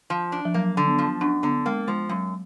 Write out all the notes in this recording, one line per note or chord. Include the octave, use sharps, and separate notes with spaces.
F3
D4
F3
F#3 A#3
D3
B3
F3
F#2 D4
D3 B3
G#3 A#3
F3 G#3
F#2 F#3